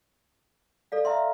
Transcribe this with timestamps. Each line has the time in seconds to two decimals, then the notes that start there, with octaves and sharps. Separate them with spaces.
0.92 A4 D5 F5
1.05 E5 F5 A#5 C6